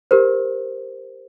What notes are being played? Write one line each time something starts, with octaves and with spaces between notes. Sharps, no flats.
G4 A#4 C5